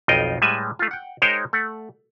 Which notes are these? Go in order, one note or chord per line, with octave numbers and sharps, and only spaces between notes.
B1 F2 D#4 F4 D#5 G5
A2 G3 G#3 B4 E5 G#5
A3 F4
F#5 G5
G#3 D#4 A#4 C5 C#5 G5
A3 F#5